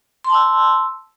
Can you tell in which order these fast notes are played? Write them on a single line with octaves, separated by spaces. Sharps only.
C6 A5 E6